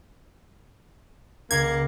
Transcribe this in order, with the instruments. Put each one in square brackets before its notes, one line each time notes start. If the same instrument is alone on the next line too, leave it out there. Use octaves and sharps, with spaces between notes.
[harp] C#2 [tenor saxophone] A#3 [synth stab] G#6